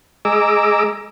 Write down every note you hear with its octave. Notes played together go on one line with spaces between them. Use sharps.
G#3 G#4 D#5 A#5 D6 E6